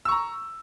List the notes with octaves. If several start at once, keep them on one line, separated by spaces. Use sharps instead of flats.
A#5 C#6 E6